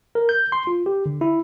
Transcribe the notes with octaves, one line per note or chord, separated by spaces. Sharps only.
A#4
G6
C6
F4
G4
D3
E4